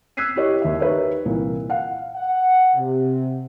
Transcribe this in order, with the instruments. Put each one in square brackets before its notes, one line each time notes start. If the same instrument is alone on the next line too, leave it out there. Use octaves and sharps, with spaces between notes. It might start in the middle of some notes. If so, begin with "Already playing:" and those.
[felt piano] E6 F#6 G#6 B6 C7 D#7
E4 G4 C#5 D#5
D#2 E5
D#4 G4 B4 C#5 E5
C2 A#2 E3
F5 F#5
[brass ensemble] F#5
C3